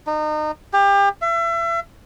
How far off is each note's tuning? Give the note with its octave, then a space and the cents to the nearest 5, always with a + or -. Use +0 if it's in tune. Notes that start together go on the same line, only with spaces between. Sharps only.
D#4 -30
G4 +30
E5 +35